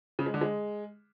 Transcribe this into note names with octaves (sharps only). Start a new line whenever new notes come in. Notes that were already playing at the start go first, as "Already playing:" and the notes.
C#3
G#3
D3
G#3